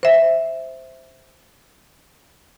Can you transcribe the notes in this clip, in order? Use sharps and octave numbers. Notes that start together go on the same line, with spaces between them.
C5 E5